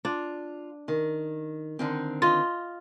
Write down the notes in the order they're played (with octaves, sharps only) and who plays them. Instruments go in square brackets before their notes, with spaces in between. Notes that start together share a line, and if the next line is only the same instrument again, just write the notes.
[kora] D4 [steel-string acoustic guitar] F4
[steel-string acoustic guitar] D#3
D3 D#3 C4
[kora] F4 D#5